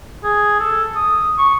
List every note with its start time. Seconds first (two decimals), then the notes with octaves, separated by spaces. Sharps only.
0.24 G#4
0.60 A4
0.95 D#6
1.38 C#6